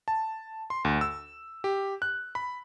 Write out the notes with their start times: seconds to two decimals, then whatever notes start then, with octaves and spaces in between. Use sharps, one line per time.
0.08 A5
0.70 C6
0.85 D2
1.01 E6
1.64 G4
2.02 F#6
2.35 B5